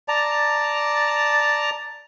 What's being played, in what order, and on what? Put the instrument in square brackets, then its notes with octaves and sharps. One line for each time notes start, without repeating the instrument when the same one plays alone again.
[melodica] D5 A5 A#5